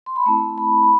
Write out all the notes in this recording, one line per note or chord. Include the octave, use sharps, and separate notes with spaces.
C6
B5
A3 C4 E4 A5
B5
B5